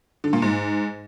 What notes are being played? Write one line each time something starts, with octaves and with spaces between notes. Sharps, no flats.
D3
A#2
G#2